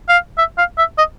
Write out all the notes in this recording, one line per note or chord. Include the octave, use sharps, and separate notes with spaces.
F5
E5
F5
E5
D#5